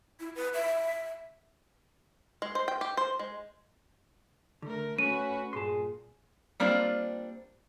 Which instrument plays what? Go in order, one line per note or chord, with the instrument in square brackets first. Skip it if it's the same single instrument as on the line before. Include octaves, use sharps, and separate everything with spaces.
[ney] E4
B4
E5
[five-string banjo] G#3
C5
G5
G4
C5
G#3
[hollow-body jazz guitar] D3 [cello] A3 A#4
[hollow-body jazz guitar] A3 [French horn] C#4 [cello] F#4 B4 [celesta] D#7
[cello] G2 A#2 [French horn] G#4 [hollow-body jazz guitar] A5 C6
[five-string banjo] G3 A#3 C4 D4 F4